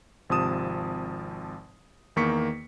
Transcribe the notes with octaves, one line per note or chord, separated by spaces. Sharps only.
G#1 C3 F3 A5 D#6 E7
E2 D#3 A#3 C#6 B6 C#7